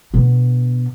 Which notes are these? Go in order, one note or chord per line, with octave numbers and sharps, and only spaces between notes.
B2 D3